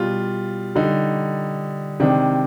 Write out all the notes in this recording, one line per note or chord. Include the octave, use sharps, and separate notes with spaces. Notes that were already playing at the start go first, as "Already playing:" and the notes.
Already playing: B2 G3 F4
D3 G3 D#4
C3 D#3 G#3 D4